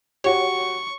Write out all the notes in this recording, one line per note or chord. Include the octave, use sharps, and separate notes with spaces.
F#4 G4 C#5 C#6